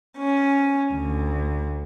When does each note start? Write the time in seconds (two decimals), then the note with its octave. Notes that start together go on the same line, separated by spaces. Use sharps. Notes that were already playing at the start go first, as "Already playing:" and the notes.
0.17 C#4
0.95 D2